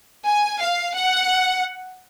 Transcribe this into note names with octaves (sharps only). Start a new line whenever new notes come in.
G#5
F5
F#5